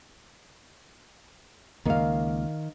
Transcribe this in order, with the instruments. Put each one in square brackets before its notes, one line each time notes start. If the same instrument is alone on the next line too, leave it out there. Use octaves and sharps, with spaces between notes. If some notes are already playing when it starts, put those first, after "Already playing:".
[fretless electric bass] C#2 A#3 [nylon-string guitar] D#3 F5